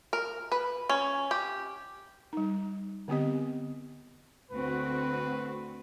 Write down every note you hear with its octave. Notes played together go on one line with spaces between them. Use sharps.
A#4
B4
C#4
G4
G3 D#4
D3 B3 C4 G4 D#5
D2 C4 F#4 B4